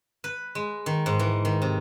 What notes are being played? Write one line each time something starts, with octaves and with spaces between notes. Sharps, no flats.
B4
G#3
D#3
G#2
E3
D#3
C3